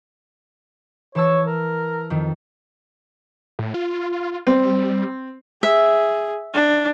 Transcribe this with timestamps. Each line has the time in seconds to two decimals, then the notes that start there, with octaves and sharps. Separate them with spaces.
1.15 E3 C#5 A5 E6
1.47 A#4
2.10 F2 D#3
3.59 A2
3.74 F4
4.47 G3 C4
5.63 G#4 E5
6.54 D4